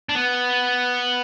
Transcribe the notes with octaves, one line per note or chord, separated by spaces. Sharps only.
D4
B3